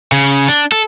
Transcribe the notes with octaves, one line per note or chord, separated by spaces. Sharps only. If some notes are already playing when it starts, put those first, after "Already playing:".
C#3
D4
A4